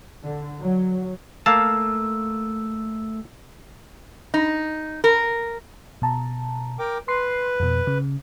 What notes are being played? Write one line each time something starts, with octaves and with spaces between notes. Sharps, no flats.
D3
F#3
A3 A#3 F5 A5 E6
D#4
A#4
B2 A5 A#5
A#4 G5 D6
B4 C6 C7
F2 B2
C#3